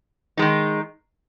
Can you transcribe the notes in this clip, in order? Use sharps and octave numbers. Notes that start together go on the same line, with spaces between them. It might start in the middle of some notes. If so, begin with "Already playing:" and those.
D#3 G#3 D#4